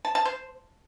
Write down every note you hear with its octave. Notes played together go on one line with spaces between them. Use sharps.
A5
A5
C5